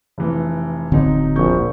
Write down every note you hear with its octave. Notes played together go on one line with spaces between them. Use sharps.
F1 E3
D1 D3 F#3 C4 D#4
A#1 C#6 G6